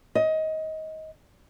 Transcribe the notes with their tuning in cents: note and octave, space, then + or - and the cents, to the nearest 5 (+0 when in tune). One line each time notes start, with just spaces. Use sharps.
D#5 +20